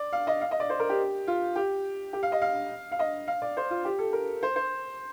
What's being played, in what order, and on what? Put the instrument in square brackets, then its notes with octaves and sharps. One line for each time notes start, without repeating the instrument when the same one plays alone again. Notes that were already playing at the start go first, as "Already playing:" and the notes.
Already playing: [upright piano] D5
F5
D#5
F5
D#5
D5
C5
A#4
G4
F4
G4
G4
F5
D#5
F5
F5
D#5
F5
D5
C5
F4
G4
A4
A#4
C5
C5